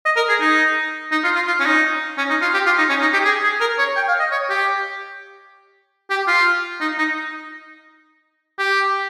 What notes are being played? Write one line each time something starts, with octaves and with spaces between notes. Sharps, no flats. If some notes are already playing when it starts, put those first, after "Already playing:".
D#5
A#4
G#4
D#4
D#4
F4
F4
F4
C#4
D#4
C#4
D#4
F4
G4
F4
D#4
C#4
D#4
G4
G#4
G#4
A#4
C#5
G5
F5
D#5
C#5
G4
G4
F4
D#4
D#4
G4